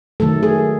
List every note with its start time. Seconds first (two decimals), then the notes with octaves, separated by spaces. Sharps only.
0.20 D#3 F#3 A3 A4
0.43 G#4